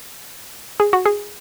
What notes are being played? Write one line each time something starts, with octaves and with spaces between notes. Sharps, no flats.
G#4
F#4
G#4